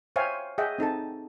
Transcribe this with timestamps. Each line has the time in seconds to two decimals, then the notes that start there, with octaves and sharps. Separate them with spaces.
0.16 C5 C#5 E5 F5 G5 G#5
0.58 G#4 D#5 E5 F#5 G5
0.78 C4 D#4 A4 A5